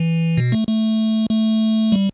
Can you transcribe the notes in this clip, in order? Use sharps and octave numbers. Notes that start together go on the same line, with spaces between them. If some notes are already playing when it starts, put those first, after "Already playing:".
Already playing: E3
B2
A3
A3
A3
G3